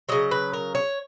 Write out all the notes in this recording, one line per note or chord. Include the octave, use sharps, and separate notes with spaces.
C#3 F#3 D#5
B4
A#4
C#5